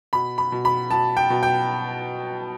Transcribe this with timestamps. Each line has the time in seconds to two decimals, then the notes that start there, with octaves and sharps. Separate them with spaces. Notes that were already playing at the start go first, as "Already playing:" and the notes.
0.13 B2 B5
0.38 B5
0.52 B2
0.65 B5
0.90 B2 A5
1.17 G5
1.30 B2
1.43 G5